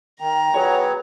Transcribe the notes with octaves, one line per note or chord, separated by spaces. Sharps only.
D#3 G5 A#5
F#3 B3 G#4 C#5